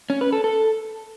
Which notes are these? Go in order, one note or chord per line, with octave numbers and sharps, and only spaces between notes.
C#4
B4
A4
A4